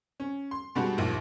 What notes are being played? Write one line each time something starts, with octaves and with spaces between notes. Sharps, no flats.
C#4
C6
B2 G3 G#3 D4 F#4 G4
A#1 D#2 A#2